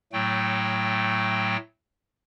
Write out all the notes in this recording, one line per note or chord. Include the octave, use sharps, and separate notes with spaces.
A2 F#3 A3 G5